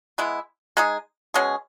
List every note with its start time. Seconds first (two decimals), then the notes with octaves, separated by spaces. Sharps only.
0.18 G#3 B3 E4
0.77 G#3 D#4 G#4
1.34 B2 G#3 C#4 G#4